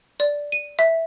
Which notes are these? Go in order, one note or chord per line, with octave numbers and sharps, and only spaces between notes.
D5
D#7
E5